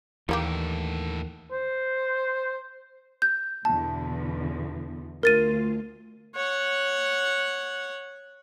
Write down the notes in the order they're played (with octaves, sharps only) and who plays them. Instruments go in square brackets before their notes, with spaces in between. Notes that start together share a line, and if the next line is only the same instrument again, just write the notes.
[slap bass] D#2 [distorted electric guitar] A2 D3 [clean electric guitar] E3 [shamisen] G3 A#3 G4
[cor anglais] C5
[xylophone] G6
[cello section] E2 B2 D3 [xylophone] A5
[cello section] D2 F4 [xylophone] A#4 A6 D#7
[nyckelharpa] C#5 F#5